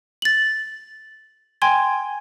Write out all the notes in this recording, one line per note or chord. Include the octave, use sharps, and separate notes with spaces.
A6 F#7
G5 G#5 C6 G#6